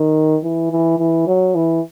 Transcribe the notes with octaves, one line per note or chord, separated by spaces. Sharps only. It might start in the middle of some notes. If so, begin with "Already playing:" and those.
Already playing: D#3
E3
E3
E3
F#3
E3